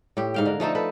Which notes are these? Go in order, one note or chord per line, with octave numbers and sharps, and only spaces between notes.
A2 G4
G#2 F5 G5
D3 A#4
F3 A3 D#4 A4
A4 B4